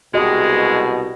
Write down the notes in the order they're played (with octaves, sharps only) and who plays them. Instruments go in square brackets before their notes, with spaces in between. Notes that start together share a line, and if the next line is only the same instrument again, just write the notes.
[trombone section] C2 B2 [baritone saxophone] G#3 [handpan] F#4 G4 D#5